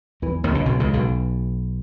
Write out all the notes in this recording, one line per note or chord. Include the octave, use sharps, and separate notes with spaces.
E2 E3
D#2 D#3
C#2 C#3
B1 B2
C#2 C#3
B1 B2